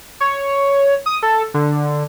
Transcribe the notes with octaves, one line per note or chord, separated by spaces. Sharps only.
C#5
D#6
A4
D3